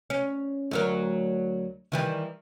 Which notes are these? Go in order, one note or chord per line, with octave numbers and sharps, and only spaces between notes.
C#4
D2 F#3 A#4
D#3 E3 G3